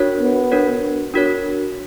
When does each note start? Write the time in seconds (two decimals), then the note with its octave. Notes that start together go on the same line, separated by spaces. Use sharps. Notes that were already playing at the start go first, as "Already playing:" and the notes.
Already playing: D4 F#4 A#4 C#5
0.20 B3
0.51 D4 F#4 A#4 C#5
1.14 D4 F#4 A#4 C#5